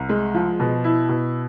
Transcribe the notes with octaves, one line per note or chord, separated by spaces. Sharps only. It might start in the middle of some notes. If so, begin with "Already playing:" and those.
Already playing: C2
G#3
F3
B2
E4
B2